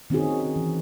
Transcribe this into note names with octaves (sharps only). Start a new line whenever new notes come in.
D#3 C4 C#4 D#4 F#4 G#4
E3